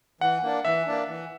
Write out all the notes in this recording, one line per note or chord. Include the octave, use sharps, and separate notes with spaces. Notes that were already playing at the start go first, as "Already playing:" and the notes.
E3 F#5
A#3 D4
E3 E5
A#3 D4
E3